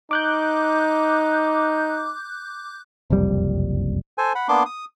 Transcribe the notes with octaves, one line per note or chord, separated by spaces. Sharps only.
D#4 D6 F#6 G6
F#1 C2 F2 G3
A4 C5 G#5
F#5 B5
A#3 B3 D4 C6 D6
D#6